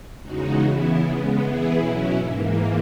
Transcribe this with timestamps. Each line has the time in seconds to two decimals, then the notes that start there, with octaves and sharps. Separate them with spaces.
0.22 E2 C#3 G#3 D#4 F#4
0.60 C#3 E3 B3 E4
1.00 C#3 G#3 B3
1.38 E3 B3 E4 G#4
1.77 B2 F#3 C#4 E4
2.16 G#2 E3 A#3